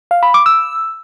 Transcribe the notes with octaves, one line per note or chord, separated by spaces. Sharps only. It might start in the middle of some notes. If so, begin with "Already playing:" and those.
F5
B5
D6
E6